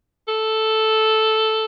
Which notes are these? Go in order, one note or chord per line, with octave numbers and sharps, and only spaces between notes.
A4